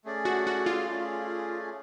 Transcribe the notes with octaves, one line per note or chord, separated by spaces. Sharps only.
A3 C#4 G#4 D5
F#4
F#4
F4
A3 C#4 G#4 D5